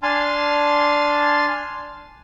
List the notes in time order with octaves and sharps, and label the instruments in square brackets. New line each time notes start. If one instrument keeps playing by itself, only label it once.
[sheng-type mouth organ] D4 G#5 A5 C6 F6